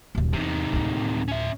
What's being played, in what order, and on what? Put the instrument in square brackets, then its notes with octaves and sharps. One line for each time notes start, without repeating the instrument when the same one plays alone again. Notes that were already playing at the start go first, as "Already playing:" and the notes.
[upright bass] D#1 B1
[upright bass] E2 [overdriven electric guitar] C3 D#3
[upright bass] D2 A2
[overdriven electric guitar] C#4 E5